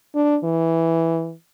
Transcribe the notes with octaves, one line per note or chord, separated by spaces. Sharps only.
D4
E3